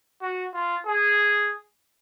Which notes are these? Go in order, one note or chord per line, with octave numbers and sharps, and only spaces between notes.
F#4
F4
G#4